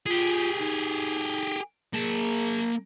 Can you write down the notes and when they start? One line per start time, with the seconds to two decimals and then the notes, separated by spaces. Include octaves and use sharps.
0.06 F4 G4 G#4
0.58 D#4
1.93 A#3 G#4 A5